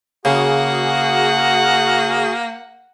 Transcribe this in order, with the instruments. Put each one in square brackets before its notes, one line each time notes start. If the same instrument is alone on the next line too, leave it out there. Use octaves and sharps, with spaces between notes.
[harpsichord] C#3 [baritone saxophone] A#3 [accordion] F#4 G#4 [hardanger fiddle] F#5